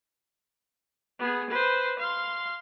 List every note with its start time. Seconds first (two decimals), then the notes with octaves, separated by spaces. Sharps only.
1.19 B3 G#4
1.50 B4 C5
1.99 F5 C6